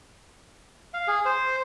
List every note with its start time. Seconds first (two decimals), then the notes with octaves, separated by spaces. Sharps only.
0.94 F5
1.08 G#4
1.25 C5